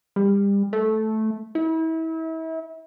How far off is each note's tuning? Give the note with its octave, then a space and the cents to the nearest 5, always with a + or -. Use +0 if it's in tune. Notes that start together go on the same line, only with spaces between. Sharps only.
G3 +30
A3 -10
E4 -35